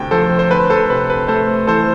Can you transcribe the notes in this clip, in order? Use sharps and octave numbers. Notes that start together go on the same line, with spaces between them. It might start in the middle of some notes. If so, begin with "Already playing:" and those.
Already playing: D2 C3 G5
F3 A4 C5
C5
D2 B4
A4 C5
C3 B4
B4
A3 A4 C5
E3 A4 C5